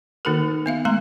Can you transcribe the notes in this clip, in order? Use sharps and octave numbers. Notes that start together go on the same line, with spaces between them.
D#3 A#3 D#4 F#4 A4 A#4
B3 E5 F5
G#3 A3 A#5 C6